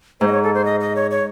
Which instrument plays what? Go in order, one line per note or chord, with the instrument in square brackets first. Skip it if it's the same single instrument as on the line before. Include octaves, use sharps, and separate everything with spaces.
[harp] G#2 [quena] C5
[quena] D#5
C#5
A4
C5
D#5
D#5
C#5
C#5